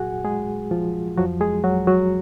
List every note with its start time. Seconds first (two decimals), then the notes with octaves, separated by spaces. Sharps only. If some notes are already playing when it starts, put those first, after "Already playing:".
Already playing: A#2 F#3 F#4 G#4 F#5 G#5
0.24 G#3 G#4
0.71 F3 F4
1.17 F2 F3 F#3 F#4
1.40 G#3 G#4
1.64 F#3 F#4
1.87 F#3 F#4